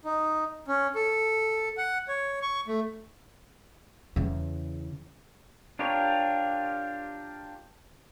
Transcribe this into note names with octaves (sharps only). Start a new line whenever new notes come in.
D#4
C#4
A4
F#5
C#5
C#6
A3
E2 C#3
D4 F4 G4 A#4 C#5